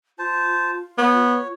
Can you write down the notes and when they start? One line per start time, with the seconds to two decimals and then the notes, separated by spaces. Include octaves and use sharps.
0.19 F4 C5 A5
0.98 B3 C#5